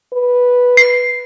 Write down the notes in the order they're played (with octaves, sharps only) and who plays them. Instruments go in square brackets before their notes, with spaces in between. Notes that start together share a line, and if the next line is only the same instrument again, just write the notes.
[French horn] B4
[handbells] C7